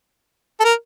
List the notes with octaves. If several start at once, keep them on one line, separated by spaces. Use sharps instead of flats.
A4
A#4